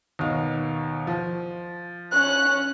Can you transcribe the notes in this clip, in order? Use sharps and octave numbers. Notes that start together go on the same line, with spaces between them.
D#2 B2 F5
F3
C#4 F#6